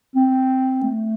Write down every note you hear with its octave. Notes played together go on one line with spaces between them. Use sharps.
C4
A3